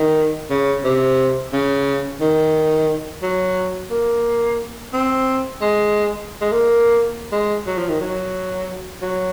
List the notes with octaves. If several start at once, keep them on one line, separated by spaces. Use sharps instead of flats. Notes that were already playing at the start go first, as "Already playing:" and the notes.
Already playing: D#3
C#3
C3
C#3
D#3
F#3
A#3
C4
G#3
G#3
A#3
G#3
F#3
F3
D#3
F#3
F#3